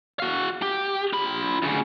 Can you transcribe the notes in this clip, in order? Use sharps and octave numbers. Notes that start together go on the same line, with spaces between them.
F#4 F5
G4
F4 B5
D2 C#3